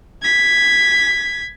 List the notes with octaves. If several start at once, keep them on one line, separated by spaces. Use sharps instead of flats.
G#6 B6